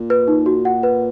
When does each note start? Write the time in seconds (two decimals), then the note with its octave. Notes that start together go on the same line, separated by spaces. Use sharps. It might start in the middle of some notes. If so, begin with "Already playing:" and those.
Already playing: A#2
0.10 B4
0.28 D#4
0.46 F#4
0.65 F#5
0.83 B4